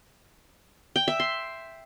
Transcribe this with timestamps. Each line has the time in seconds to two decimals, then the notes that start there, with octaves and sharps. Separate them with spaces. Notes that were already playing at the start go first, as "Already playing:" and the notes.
0.96 G5
1.08 E5
1.20 C6